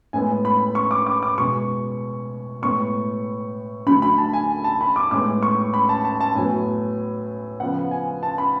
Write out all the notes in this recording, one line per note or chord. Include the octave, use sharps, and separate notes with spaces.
A2 G#3 B3 G#5
B5
C#6
D6
D6
D6
B2 G#3 B3 C#6
A2 G#3 B3 C#6
D3 F#3 A3 B5
B5
A5
G#5
A5
B5
D6
A2 G#3 B3 D6
C#6
B5
A5
A5
A5
A2 F#3 B3 G#5
C#3 F3 B3 F#5
G#5
A5
B5